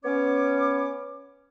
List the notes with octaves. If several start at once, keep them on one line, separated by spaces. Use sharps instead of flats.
B3 C#4 C#5 D6